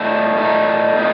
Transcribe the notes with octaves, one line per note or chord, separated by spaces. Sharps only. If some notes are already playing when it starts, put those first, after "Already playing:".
Already playing: A#2 A3 D#4 A4
A#2 A3 D#4 A4
A#2 A3 D#4